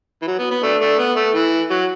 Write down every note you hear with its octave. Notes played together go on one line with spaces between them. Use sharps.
E3
F#3
B3
B3
A3 D4
A3 D4
B3
A3
E3
F#3